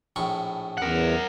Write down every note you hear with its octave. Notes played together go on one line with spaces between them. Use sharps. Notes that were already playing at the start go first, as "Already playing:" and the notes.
A#1 A2 C#6
E2 A#4 F#5